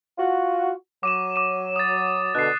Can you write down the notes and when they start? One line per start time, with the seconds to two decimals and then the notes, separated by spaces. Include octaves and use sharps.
0.18 F4 F#4
1.03 F#3 D6 D#7 E7
1.36 D6 D#7
1.76 D#6 A6
2.35 B2 D3 F#6 C7